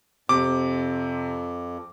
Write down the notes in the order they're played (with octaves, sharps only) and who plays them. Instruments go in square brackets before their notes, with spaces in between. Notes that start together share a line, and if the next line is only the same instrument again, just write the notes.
[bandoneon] F2 [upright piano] C3 [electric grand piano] D6